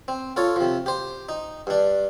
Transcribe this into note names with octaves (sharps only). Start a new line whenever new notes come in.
C4
F4 A4 C#5
C3 F3
G4 C5
D#4
G2 D4